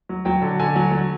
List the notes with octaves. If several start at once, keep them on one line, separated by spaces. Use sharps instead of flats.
F#3
F#3 G5
D3
D3 G#5
F#3
F#3